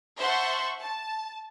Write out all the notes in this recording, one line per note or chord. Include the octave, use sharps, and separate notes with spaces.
C5 E5 F#5 A5 C6 C#6
A5